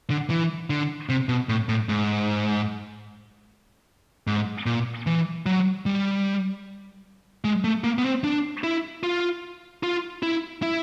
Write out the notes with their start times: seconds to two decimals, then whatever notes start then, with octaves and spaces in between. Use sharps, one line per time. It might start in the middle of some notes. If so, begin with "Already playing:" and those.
0.10 D3
0.30 E3
0.70 D3
1.09 C3
1.29 B2
1.49 A2
1.69 A2
1.89 G#2
4.27 G#2
4.66 A#2
5.07 E3
5.46 F#3
5.86 G3
7.44 G#3
7.64 A3
7.84 A#3
7.98 B3
8.04 C4
8.24 D4
8.64 E4
9.03 F4
9.83 F4
10.23 E4
10.62 E4